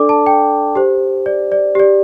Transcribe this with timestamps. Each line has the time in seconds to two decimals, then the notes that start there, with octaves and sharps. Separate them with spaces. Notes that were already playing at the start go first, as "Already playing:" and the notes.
Already playing: D4 A4 D5 D6
0.09 A5
0.26 G5
0.75 G4 C5
1.26 D5
1.52 D5
1.75 G4 D5